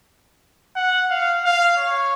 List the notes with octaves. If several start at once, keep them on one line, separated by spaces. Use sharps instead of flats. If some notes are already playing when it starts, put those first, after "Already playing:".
F#5
F5
F5
C#5